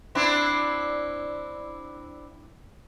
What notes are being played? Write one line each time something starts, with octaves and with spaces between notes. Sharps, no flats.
C4 D4 E4